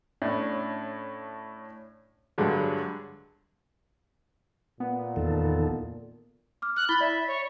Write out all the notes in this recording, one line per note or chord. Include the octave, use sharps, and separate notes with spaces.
A2 C#4 D4
G2 D3 F#3 G#3
A#2 B3
E2 D#3 A4
D6 F6
F6 F#6
E4 B5 A6 G7
D5 E5 B5 A6
C#5